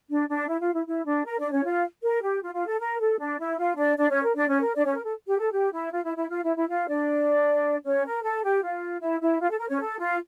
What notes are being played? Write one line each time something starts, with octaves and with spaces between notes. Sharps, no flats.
D4
D4
E4
F4
E4
E4
D4
A#4
D4 D5
C#4 C#5
F4
A#4
G4
F4
F4
A4
A#4
A4
D4
E4
F4
D4 D5
D4 D5
C#4 C#5
A#4
D4 D5
C#4 C#5
A#4
D4 D5
C#4 C#5
A#4
A4
G4
A4
G4
E4
F4
E4
E4
F4
E4
E4
F4
D4 D5
C#4 C#5
A#4
A4
G4
F4
E4
E4
F4
A4
A#4
C#4 C#5
A4
F4